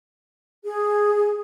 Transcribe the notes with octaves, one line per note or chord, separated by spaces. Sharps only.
G#4